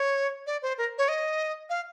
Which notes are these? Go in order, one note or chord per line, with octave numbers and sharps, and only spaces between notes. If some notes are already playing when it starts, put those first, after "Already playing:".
Already playing: C#5
D5
C5
A#4
C#5
D#5
F5